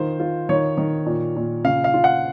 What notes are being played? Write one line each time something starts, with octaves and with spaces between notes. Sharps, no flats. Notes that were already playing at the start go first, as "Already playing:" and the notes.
Already playing: D#3 F4 C5
F4
D#3 C#5
D#3
A#2
A#2
C#3 F5
F5
F4
F#5